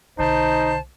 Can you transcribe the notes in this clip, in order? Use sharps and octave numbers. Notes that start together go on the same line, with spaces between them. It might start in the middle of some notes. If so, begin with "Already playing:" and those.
B1 D3 D#4 C5 A5